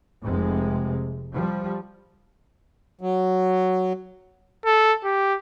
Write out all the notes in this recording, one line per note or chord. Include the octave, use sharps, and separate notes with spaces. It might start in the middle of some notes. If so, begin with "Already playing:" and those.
F1 C3 G#3
F3 G3
F#3
A4
G4